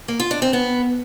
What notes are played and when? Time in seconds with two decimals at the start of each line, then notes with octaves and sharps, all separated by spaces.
0.08 A#3
0.20 F4
0.31 D4
0.42 C4
0.53 B3